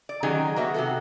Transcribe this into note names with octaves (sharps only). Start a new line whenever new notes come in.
D5
D#3 F#3 C#4 D#4 G4 G#4
A#3 B3 F#4 E5
C3 F#4 A4